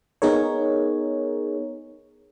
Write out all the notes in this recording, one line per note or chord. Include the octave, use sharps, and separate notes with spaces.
B3 D#4 G#4 A#4 C#5